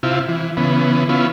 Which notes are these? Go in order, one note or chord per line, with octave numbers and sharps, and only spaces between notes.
C3 E4 F4
E3
C#3 E3 B3
B3 C#4 E4 F4